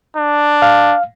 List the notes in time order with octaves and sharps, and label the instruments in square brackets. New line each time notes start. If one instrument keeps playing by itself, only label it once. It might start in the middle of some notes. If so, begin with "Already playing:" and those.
[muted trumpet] D4
[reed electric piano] F5